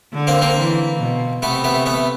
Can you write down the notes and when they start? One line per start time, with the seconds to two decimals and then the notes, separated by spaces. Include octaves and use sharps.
0.13 D3
0.27 A#3 C4
0.42 A#3 C4
0.57 E3
0.99 B2
1.42 C3 A3 B3
1.64 A3 B3
1.86 A3 B3